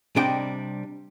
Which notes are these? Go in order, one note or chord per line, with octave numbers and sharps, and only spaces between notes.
C3 G3 D4 D#5 G5